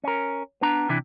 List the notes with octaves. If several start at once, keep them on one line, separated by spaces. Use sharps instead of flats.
C#4 A#4
B3 D4 A#5
C3 E3 D4 E4